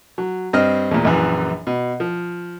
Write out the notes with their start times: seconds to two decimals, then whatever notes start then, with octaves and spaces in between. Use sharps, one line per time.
0.18 F#3
0.53 G2 C4 D#5 F6
0.91 E2 A#2
1.05 A#1 F#2 E3
1.67 B2
2.00 F3